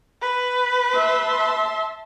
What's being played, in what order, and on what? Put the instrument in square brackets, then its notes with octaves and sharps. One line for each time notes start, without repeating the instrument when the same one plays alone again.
[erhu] B4
[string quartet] E5 A5 C6